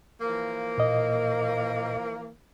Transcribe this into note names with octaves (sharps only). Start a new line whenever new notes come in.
E3 F3 A#3
A#2 D#5